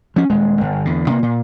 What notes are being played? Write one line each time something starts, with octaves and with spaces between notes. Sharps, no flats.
F3 C#4
D#1 G#3
G1
E2 D3
C3 A#3
A#2